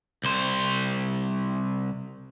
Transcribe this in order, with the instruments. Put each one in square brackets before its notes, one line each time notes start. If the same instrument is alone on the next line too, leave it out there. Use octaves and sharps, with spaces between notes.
[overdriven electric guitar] C2 C5